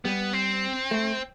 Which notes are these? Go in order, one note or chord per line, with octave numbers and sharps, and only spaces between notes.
G3 B3
C4
A3